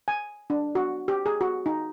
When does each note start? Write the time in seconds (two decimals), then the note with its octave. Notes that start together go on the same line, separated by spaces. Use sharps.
0.08 G#5
0.50 D4
0.75 F#4
1.08 G4
1.26 G#4
1.41 F#4
1.66 D#4